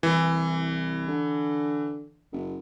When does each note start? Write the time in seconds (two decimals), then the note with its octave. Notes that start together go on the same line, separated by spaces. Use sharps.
0.03 C2 E3
1.08 D3
2.32 F#1